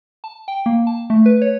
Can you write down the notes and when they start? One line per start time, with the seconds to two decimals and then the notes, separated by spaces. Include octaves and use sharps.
0.24 A5
0.48 G5
0.66 A#3
0.87 A5
1.10 A3
1.26 B4
1.42 C#5